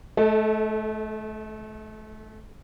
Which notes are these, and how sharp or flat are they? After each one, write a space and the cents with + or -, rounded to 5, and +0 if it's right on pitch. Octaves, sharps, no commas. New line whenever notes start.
A3 -30 A4 +0 D#5 +25